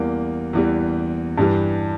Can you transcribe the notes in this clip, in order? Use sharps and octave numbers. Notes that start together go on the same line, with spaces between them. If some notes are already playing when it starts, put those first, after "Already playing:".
Already playing: E2 E3 G3 A#3
E2 E3 G3
G2 E3 G3